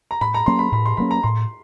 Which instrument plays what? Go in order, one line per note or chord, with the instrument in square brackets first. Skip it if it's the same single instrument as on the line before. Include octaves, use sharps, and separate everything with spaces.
[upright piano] A#5
[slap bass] A2 [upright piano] B5
[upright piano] A#5
[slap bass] F#3 A#3 C#4 [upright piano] C6
[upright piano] B5
[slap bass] A2 [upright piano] B5
[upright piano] C6
[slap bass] F#3 A#3 C#4 [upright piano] B5
[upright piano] A#5
[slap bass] A2 [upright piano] C6